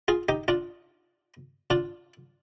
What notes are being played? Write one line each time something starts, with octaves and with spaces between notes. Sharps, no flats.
F4 G#4
D#4 G4
D4 F4
D4 F4